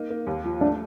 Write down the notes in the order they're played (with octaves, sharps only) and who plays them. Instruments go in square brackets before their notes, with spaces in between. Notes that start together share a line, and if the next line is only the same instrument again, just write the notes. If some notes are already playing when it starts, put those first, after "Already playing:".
Already playing: [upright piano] A#3 D#4
A#3
D#2
F3
[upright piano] A3 [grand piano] D4